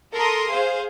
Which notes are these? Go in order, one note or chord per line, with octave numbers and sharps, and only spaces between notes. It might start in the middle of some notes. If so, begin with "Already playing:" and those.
A4 A#4 A#5 C6 D#6
G#4 C5 F5